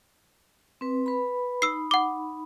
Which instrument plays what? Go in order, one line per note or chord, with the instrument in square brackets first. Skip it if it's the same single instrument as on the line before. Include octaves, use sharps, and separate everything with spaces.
[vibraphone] C4 B4
B4 B5
[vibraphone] D#4 B5 [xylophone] E6 C7
[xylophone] F#5 D6